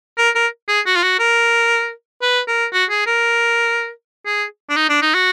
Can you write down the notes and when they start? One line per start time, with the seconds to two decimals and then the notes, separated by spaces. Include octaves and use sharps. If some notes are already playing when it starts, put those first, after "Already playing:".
0.18 A#4
0.35 A#4
0.68 G#4
0.86 F#4
0.96 F4
1.03 F#4
1.19 A#4
2.22 B4
2.48 A#4
2.73 F#4
2.90 G#4
3.07 A#4
4.26 G#4
4.70 D4
4.76 D#4
4.89 D4
5.02 D#4
5.14 F#4